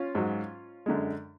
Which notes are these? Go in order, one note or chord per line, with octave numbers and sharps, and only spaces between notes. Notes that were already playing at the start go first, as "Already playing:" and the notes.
Already playing: C#4 F4
G#2 F#3
F#2 D3 G#3